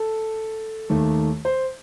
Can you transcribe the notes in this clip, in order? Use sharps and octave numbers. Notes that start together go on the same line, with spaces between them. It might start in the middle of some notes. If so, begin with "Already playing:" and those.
Already playing: A4
D#2 D#3 A3
C5